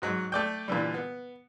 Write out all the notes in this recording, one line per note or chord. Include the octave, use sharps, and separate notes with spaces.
G#2 F#3 G#3
A3 D5 G5
A#2 D3 E3 G3
B3